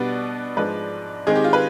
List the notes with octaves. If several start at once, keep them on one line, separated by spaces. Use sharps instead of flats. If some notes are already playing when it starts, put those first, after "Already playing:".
Already playing: B2 G3 B3 D4 B4
G#2 F3 G#3 D4 B4
D#3 G#3 C4 D#4 G#4
G4
F4
B4